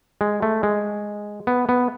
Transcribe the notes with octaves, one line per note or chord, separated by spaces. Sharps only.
G#3
A3
G#3
B3
B3